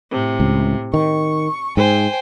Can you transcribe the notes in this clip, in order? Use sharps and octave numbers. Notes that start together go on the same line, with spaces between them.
A2 C3
C#2
D#3 C#6
G#2 C5 G5 G#5